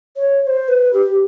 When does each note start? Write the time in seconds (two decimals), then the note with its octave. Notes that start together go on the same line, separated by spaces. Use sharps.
0.16 C#5
0.42 C#5
0.47 C5
0.68 B4
0.93 G4